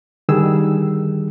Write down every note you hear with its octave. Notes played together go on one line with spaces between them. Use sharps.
D3 D#3 G3 G#4 E6